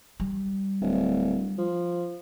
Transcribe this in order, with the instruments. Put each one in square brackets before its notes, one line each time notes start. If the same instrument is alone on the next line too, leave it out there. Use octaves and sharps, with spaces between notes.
[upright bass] G3
[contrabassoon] D1
F3